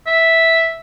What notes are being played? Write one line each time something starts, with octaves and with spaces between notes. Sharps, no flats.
E5